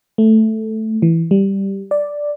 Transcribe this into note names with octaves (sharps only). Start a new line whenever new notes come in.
A3
E3
G3
D5